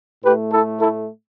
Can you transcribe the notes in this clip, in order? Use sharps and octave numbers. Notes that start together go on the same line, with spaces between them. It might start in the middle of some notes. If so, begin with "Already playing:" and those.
A2 A3 G4 B4
E4 A4
E4 A4